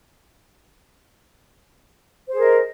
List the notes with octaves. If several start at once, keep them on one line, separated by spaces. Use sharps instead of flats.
G#4 A#4 C5 D#5